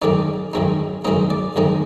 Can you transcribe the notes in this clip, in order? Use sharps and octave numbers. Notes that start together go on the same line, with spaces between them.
F#2 D#3 G#3 C4 D#4 D5
F#2 D#3 G#3 C4 D#4
F#2 D#3 G#3 C4 D#4 D#5
D5
F#2 D#3 G#3 C4 D#4